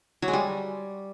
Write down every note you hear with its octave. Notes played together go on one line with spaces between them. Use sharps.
F#3
G#3
G3